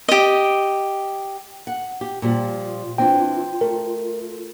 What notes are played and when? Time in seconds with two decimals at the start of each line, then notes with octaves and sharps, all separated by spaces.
0.08 G4 D#5
1.67 F#5
2.01 G4
2.22 A#2 F3 G3 F4
2.98 E3 C4 D4 G5
3.61 A3 A#4